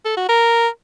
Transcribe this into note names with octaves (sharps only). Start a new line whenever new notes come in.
A4
F#4
A#4